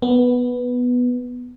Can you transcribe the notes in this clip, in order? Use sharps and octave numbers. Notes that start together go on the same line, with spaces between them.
B3